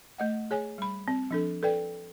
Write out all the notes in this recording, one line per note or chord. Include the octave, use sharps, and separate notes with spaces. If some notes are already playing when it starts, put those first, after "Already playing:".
A3 D#5 F#5
G#4 C#5 G#5
G3 B5
C4
F3 D4 A4
A4 B4 D5 G5